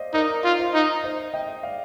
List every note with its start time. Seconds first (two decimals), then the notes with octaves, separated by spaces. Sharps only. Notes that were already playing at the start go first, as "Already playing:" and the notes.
Already playing: C5 D5 D#5 F5
0.13 D#4 A#4 D5
0.44 F4
0.59 C5 D#5
0.74 D#4
1.04 C5 D#5
1.34 D#5 G5
1.63 D5 F5